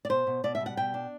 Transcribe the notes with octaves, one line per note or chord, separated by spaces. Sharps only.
D5
B2 C5
B2
B2 D5
E5
G3
F#5
B2 G5
D4